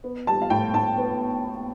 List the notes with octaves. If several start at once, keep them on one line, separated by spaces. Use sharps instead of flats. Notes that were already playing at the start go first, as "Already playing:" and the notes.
B3
G3 A5
F5
A2 G5
A2 A5
B3